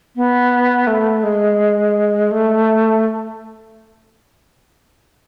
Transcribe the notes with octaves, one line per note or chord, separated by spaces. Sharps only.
B3
A3
G#3
A3